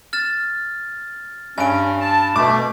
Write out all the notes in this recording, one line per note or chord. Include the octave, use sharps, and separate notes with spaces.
F6 A6 E7
G2 C#4 G#5 D7
A5
B2 A3 D6